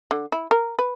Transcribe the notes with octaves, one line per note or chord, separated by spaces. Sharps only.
D3
E4
A#4
B4